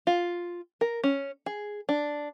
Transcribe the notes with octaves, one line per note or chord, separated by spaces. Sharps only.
F4
A#4
C#4
G#4
D4